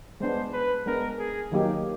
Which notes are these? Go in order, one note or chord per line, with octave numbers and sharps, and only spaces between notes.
G#3 B3 D4 C5
B4
G#3 B3 D4 A#4
G#4
D#3 F#3 A#3 D#4 G4